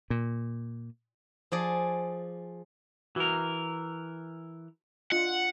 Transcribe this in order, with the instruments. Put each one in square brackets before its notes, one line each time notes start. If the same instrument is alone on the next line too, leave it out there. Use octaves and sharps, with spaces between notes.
[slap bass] A#2
[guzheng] F3 G#4 D5
[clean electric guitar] E3 A#4 [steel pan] F#4 A#5
[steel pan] D4 F4 D#5 [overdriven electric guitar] F#5